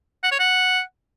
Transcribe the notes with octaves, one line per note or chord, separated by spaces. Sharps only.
F#5
C#5
F#5